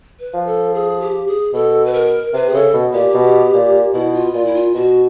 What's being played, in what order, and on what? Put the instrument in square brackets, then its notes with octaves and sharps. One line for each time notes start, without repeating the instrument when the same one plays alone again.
[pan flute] B4
[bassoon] F3
[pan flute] A4
G#4
G4
G#4
[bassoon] B2 [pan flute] A4
[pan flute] B4
A#4
[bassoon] C3 [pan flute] B4
[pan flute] G#4
[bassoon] C#3 [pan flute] A4
[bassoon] B2
[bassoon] A#2 [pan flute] G4
[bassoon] B2
A#2
[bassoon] B2 [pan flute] E4
[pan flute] F4
[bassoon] A#2 [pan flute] F4
[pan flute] E4
F4
[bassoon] B2 [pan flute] F#4